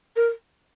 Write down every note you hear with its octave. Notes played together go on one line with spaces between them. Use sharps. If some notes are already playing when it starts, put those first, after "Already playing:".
A#4